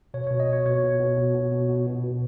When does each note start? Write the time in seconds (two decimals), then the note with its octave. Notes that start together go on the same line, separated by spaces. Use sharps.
0.14 B2 C#5
0.27 B2 C#5
0.40 D#5
0.48 B2 C#5
0.65 B2 C#5
0.83 B2
1.00 B2
1.17 B2
1.34 B2
1.52 B2
1.68 B2
1.86 B2
2.04 B2